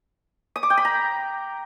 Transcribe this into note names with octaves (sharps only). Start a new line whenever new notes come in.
D#6
D6
G5
B5
A#5